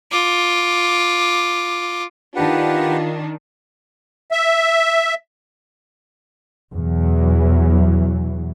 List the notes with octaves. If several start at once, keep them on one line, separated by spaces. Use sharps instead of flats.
F4 D6
D#3 D4 F4 G4 B4 F#5
E5
E2 B2 E3 F#3